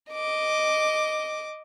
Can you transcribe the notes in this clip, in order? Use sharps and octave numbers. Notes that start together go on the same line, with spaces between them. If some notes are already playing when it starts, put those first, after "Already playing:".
D#5 D6